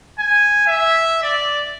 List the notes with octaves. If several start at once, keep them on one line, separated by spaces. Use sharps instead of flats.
G#5
E5
D5